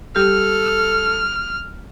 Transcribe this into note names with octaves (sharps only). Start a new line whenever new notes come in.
G3 G4 A4 F6